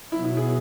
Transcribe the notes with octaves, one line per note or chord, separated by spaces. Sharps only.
B2 F#3 B3 E4
E4
G#4